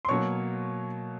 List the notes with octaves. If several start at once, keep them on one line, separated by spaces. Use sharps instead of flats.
C6
B2 F#3 A#3 C#5 C#6